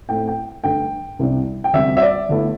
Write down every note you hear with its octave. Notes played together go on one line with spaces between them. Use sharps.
A2 A3 C4 E4 G5
G5
G2 D3 A3 G5
C2 C3 G3 D4
G5
D2 C3 G3 E5
E5
D5
G1 G2 D3 A3 E4